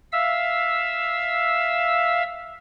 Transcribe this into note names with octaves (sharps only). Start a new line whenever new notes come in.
E5 F5 E6